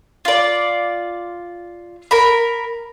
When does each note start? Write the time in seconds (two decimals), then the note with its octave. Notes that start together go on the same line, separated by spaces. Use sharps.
0.25 F4 D5
2.11 A#4 A#5 B5